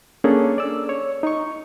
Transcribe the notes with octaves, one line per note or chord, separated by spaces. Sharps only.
A#3 C#4 D4 G#4 A4
D5 E6
C#5
D#4 C#6